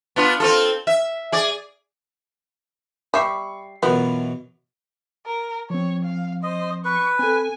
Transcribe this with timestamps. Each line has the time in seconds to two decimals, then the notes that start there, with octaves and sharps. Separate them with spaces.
0.16 B3 D4 F4
0.40 C4 F4 A4
0.87 E5
1.32 G#4 D5
3.14 G3 E5 B5 C#6 C7
3.83 F#2 B2 E3 B3 F4 A#4
5.26 A#4
5.70 F3 C4 C#5
6.05 F5
6.43 C5 D#5
6.85 B4 C#6
7.19 C4 A4 G#5